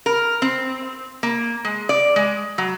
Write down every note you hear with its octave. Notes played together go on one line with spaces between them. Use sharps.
A#4
C4
A#3
G#3
D5
G#3
F#3